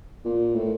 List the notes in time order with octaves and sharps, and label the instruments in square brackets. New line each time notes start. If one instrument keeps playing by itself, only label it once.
[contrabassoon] A#2
A2